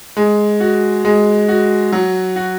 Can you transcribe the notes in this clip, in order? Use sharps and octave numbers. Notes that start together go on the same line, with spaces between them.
G#3
F#4
G#3
F#4
F#3
F#4